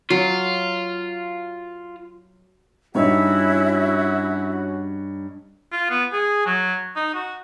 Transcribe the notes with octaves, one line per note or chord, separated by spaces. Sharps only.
F#3 F4
G2 C#4 D#4 E4 F#4 C#5
F4
B3
G#4
F#3
D#4
F#4